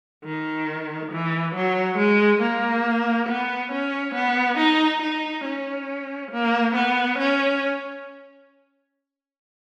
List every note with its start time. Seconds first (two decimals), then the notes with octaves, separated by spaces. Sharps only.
0.25 D#3
1.12 E3
1.55 F#3
1.98 G#3
2.42 A#3
3.29 B3
3.72 C#4
4.15 B3
4.58 D#4
5.02 D#4
5.45 C#4
6.31 A#3
6.75 B3
7.19 C#4